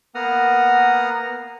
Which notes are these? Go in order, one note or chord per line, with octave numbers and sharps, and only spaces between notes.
A#3 B3 F#5 A#5 D#6 F6